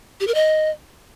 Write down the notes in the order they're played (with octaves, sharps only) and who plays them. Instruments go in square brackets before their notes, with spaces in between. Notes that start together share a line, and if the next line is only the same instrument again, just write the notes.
[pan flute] G4
A#4
D#5